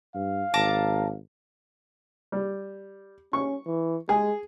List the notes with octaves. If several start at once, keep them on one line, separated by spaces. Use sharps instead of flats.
G2 F5
G#1 A5 A#5 D6
G3
C#4 C#6
E3
G#3 G#4